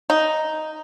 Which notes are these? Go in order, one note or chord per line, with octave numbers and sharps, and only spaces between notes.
D#4